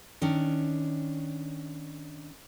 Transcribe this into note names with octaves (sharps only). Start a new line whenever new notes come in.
D#3 C#4 D4